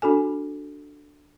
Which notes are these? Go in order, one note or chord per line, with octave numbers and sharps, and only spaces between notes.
D4 F#4 A4 G#5